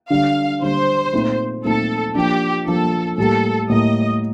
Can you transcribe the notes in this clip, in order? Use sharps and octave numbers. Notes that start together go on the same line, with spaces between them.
D3 G3 D4 F5
D3 G3 D4 C5
A#2 A3 C4 D#4
A#2 A3 C4 D#4 A4
F3 A#3 D4 G4
F3 A#3 D4 A4
A2 G3 A#3 A4
A2 G3 A#3 D#5